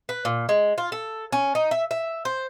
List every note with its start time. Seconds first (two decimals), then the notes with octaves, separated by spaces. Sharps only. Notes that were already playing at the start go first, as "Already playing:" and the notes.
0.09 B4
0.25 A#2
0.49 G#3
0.78 F4
0.92 A4
1.32 C#4
1.55 D#4
1.71 E5
1.91 E5
2.25 C5